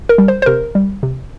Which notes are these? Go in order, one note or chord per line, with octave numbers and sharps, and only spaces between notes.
A#4
G3
C5
C5
C3 A#4
G3
C3